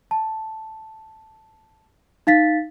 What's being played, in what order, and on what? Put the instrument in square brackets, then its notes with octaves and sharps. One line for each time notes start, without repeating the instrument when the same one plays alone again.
[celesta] A5
D#4 F5 A6 B6